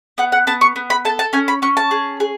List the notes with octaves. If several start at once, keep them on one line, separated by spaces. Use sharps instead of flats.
B3 F#5
F#5
B3 A5
C#6
B3
B5
A4 A5
A5
C#4 G#5
B5
C#4 C#6
A5
G#4
G#4